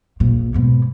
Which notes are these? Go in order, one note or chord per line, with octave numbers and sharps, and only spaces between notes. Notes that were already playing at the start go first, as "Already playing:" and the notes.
A#1 A#2
G#2 B2